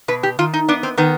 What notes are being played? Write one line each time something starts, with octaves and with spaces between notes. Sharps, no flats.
B2 B4
G4
D#3 F4
D#4
B3 D4
C4
D#3 B3